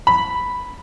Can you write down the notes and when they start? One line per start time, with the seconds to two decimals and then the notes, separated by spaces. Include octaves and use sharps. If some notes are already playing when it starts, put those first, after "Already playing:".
0.07 B5